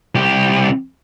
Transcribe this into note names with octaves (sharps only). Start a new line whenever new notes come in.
C2 G4